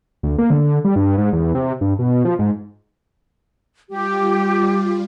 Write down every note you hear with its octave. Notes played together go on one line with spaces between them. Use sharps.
D2
A#3
D3
G3
G2
G#2
E2
C3
G2
B2
F3
G#2
G3 F4 G4